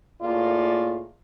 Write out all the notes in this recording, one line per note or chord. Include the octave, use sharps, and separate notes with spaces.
A2 A#3 F4 G#4 D5